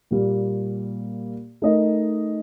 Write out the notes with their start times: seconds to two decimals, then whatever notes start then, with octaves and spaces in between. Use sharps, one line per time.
0.11 A#2 G3 A#3
1.62 A3 D#4 A#4 D#5